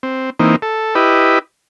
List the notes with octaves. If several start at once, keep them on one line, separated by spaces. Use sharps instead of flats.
C4
E3 A#3 C4 D#4
A4
E4 G4 B4 D#5